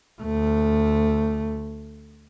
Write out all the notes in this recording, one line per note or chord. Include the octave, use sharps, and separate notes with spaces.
D2 A3